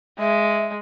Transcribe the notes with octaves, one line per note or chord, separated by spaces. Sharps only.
G#3 E5